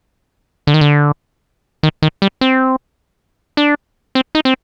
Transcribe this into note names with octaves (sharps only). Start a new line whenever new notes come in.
D3
D#3
D3
D#3
D#3
G3
C4
D4
C4
D#4
C4